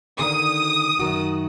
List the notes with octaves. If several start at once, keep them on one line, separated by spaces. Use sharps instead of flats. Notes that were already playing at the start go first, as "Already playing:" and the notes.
D3 D#3 D#6
F#2 D#3 F#4